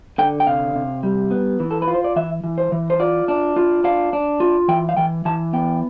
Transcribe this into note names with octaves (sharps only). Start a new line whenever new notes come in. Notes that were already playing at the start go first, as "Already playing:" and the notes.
D3 G5
G5
C3 F5
C3
G3
B3
E3
A4
B4
F4
C5
D5
E3 E5
E3
C5
E3
C5
F4 D5
D4
F4
D4 F5
D4
F4
E3 G5
F5
E3 G5
E3 A5
B3 G5